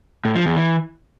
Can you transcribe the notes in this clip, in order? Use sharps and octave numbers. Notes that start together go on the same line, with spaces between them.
A2
F3
E2
E3